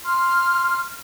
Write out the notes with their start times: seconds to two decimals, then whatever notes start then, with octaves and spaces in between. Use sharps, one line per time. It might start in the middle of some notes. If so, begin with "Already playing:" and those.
0.05 C6 F6